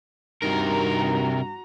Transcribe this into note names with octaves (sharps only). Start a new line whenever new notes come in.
G2 C3 D#3 F#4 A#4 A#5